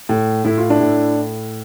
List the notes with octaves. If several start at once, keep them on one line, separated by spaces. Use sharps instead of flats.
A2
A2 E4
F4
D4 E4
A2